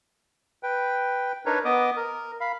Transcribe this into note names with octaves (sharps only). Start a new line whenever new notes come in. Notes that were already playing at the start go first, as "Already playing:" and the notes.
B4 G5
D4 D#4 A#4 B4 C#5
B3 D#5 D6 D#6
A#4
F5 B5